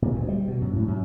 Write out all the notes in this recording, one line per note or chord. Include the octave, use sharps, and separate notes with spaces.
A#2
D2
G3
B2
F#2
A2
F#2